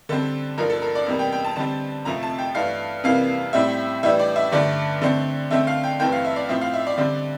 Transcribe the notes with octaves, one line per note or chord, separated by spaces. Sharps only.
D3 G3 C4 A4
G2 F3 A#3 D4 A#4
A4
A#4
D5
E2 C3 G3 A#3
G5
G5
A5
D3 G3 C4 A5
F2 C3 F3 A3 A#5
A5
G5
G2 E3 A3 D4 F5
F2 C3 E3 G3 A#3 F5
A2 G3 C4 E5
A2 E3 G3 D4 E5
D5
E5
G2 D3 A3 D5
D3 A3 C4
D3 A3 C4 E5
F5
G5
G2 E3 A3 C4 G5
F5
E5
D5
A2 F3 C4 E5
F5
E5
D5
D3 G3 C4